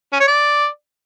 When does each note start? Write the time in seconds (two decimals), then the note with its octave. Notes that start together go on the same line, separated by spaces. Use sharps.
0.13 C#4
0.20 C#5
0.28 D5